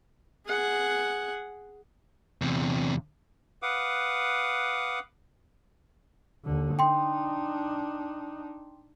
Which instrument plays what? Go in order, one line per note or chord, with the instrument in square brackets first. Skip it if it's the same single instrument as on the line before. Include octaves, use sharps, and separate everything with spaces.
[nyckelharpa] G#4 F#5
[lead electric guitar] E2 C3
[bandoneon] B4 F5 F#5 D6 D#6
[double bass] D#2 D3
[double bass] D4 D#4 [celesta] G5 C6